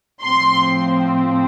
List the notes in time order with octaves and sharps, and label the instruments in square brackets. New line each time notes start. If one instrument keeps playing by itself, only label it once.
[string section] A2 F3 C4 C6